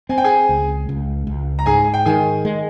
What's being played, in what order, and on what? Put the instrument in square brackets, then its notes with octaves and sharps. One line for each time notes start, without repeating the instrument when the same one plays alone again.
[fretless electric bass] C4 [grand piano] G#5
[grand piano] G5
G#4 G#5
[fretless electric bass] C#2
C#2
C#2
[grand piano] A#5
[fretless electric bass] G#2 [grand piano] G#4 G#5
[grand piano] G5
[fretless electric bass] D#3 [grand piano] G#4 G#5
[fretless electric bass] G#3